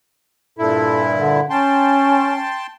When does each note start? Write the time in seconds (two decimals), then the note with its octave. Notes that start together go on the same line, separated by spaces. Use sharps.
0.59 G2 A#2 E4 A4
1.16 D3
1.50 C#4 G5 A5 C6